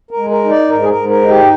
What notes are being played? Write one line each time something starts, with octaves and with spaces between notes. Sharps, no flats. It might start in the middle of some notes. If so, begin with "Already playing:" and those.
A#4
G#3
A#4
D#4
D5
G#2 A#4
G#4
A#4
G#2
A#4
D#4
G4